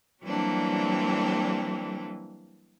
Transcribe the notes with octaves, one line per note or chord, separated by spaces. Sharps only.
E3 F#3 G3 A#3 C4 D4